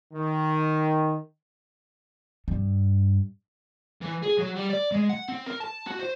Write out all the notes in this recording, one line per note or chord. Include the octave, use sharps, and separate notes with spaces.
D#3
G2
E3
G#4
F#3
G3
D5
G#3
F#5
C4
A#4
A5
F#4
C5